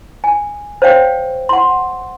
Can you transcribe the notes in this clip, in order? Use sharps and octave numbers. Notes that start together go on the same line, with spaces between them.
G#5
C5 C#5 F5 G5
F#5 C6